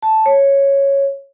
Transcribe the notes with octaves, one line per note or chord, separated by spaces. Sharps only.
A5
C#5